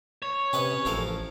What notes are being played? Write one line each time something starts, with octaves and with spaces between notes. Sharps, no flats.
C#5
C3 C#4 B4 D#5
A1 F3 A4 A#4